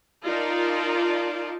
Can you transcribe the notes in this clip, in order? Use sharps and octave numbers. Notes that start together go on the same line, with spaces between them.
D#4 F4 A#4 D5 A5